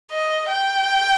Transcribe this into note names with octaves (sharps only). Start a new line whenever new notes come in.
D#5
G5